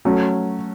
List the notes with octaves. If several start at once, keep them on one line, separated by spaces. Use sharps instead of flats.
F#3 A3 C#4